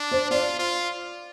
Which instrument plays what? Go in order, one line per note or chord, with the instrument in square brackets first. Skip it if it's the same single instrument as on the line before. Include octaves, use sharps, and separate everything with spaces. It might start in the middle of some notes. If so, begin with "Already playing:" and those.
Already playing: [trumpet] D4
[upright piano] C5
[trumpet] F4 [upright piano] D5
[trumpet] F4